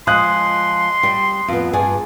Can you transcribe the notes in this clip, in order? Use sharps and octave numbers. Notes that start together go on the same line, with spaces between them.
F3 G#3 C6 D#6 F#6
G3
F2 B3
G2 G#4 D5